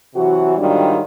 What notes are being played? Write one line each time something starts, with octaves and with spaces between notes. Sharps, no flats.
C3 E3 F#3 F#4
G#2 D#3 F#3 G3 D4 F4